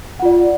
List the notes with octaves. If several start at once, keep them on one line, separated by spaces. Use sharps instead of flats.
F4 D5 F#5